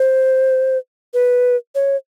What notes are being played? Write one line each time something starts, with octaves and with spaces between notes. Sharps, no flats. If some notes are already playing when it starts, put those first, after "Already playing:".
Already playing: C5
B4
C#5